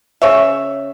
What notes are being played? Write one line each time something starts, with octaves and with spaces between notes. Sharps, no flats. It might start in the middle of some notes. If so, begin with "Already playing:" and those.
C#3 C#5 E5